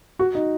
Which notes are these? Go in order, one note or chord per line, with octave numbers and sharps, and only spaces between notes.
F#4
D#4